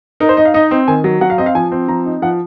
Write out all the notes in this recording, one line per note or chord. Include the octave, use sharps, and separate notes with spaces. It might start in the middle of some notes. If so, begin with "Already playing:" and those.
D#4 A#4
C5
D#4 D#5
F5
D#4 D#5
C4
D#3 G#5
F#3
F#3 F#5
F5
C4 D#5
F5
F3 G#5
C4
F3 A#5
D#4
F3 F#5